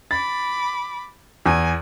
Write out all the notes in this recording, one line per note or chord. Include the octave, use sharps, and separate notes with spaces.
B5 D6 A6
E2 G#5